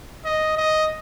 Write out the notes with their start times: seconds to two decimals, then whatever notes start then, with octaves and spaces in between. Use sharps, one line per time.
0.25 D#5
0.57 D#5